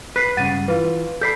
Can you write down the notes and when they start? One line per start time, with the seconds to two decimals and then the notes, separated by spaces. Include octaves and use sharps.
0.16 B4 F#6 B6 C7
0.37 G2 C#3 G#3 F#5 A6 D#7
0.68 E3 F4 B4
1.21 A4 D5 B5 G6 B6 C7